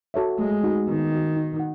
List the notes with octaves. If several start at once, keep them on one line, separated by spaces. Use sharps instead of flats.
F#4 A4 C#5 E5
G#3 A3
D#4 F#4
D#3 B3
D#4 F#4
D#4
F#5